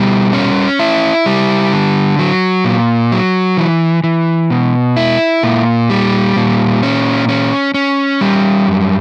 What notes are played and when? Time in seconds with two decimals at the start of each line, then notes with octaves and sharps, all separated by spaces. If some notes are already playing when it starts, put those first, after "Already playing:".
Already playing: B2 G3
0.33 C#4
0.79 E4
1.26 G3
1.73 D3
2.19 F#3
2.65 A#2
3.12 F#3
3.57 E3
4.04 E3
4.50 B2
4.97 E4
5.43 A#2
5.90 G3
6.36 A#2
6.83 C#4
7.29 C#4
7.74 C#4
8.21 G3
8.67 F#2